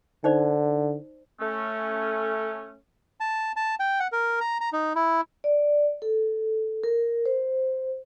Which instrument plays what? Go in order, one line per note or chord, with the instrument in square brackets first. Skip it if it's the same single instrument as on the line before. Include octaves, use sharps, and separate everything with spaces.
[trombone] D3 [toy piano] D#4 C5 D5
[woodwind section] A3 C#4
[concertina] A5
A5
G5
F#5
A#4
A#5
A#5
D#4
E4
[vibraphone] D5
A4
A#4
C5